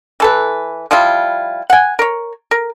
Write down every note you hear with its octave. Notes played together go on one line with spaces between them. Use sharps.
E3 A4 B4
F3 G3 E4 F4
F#5 G#5
A#4 C#5
A#4